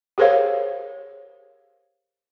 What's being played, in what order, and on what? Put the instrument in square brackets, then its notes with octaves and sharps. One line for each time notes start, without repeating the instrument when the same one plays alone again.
[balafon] G4 G#4 A#4 C5 C#5 F5